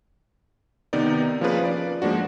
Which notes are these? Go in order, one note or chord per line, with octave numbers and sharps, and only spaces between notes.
C3 D#3 B3 D#4 D5
F3 A#3 C#4 F4 G#4 B4
D5
F3 G#3 A#3 D4 F#4